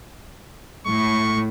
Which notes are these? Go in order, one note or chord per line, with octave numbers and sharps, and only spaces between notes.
A2 C#6